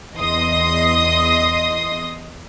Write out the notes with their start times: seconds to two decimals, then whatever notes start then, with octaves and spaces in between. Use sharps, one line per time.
0.18 E2 D#5 C6 D#6